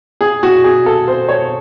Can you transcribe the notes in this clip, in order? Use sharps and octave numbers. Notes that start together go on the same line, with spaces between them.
G#4
F#4
G#4
A4
C5
C#5